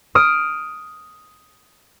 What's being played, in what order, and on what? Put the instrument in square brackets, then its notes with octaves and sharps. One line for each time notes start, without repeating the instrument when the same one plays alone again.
[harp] D#6 F6 D7